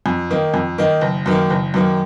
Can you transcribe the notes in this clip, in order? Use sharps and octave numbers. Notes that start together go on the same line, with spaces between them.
F2
D#3 A#3 D#4
F2
D#3 A#3 D#4
F#1
F#2 D#3 A#3
F#1
F#2 D#3 A#3